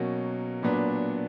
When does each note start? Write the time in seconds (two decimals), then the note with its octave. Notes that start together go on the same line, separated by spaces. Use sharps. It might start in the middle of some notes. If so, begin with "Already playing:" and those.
Already playing: B2 F#3 A#3 C#4
0.63 A#2 F#3 B3 D4